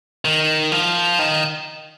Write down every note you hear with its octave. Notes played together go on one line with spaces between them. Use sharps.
D#3
F3
D#3